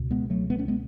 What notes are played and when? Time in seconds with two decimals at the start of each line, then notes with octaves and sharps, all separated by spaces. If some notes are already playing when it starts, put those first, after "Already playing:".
Already playing: C#2 B2
0.11 G#3 B3
0.30 F#3 A3
0.50 G#3 B3
0.58 A3 C#4
0.68 G#3 B3